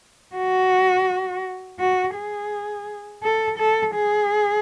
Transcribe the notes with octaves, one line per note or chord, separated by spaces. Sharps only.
F#4
F#4
G#4
A4
A4
G#4